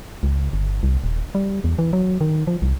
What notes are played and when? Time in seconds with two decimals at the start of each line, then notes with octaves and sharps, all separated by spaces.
0.23 C#2
0.53 G1
0.83 C2
1.04 D#1
1.35 G3
1.64 E2
1.79 E3
1.93 F#3
2.21 D#3
2.47 F3
2.62 C2